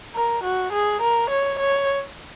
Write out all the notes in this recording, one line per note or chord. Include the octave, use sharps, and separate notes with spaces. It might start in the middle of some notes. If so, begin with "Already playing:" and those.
A#4
F#4
G#4
A#4
C#5
C#5